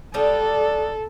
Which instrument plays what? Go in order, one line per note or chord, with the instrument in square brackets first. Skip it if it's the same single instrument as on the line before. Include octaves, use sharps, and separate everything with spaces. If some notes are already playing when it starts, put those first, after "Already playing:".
[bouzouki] G3 D4 D#4 [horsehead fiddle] A4